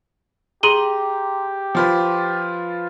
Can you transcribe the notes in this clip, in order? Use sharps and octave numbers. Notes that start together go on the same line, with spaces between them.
G4 G#4 A#5 C6 D#7 G7
F3 F4 B4